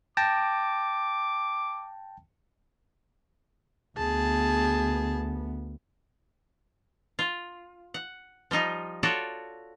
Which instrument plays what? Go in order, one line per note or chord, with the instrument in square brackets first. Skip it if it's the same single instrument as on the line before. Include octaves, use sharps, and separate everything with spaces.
[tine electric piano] G5 A5 A#6 [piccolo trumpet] D6
[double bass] D2 B3 [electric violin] G#4 A5
[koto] F4
F#5
F3 G3 D#4 F4
F4 F#4 A4 C#5 D5